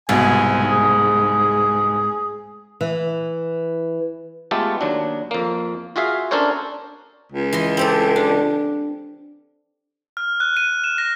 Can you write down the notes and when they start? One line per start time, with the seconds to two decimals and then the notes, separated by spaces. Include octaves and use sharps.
0.09 C2 G#2 B2 G#5
0.68 G#4
2.81 E3
4.51 G#3 A3 B3 F4 G4 A4
4.81 D#2 F#3 D4
5.31 F2 A#3
5.96 F4 F#4 G#4 E5 F5
6.31 C#4 D4 A4 A#4 C5 C#5
7.32 C#2
7.53 E3 D#5 C6
7.77 C4 G4 A4
8.16 D4
10.17 F6
10.40 F#6
10.57 D#7
10.84 E7
10.98 A#6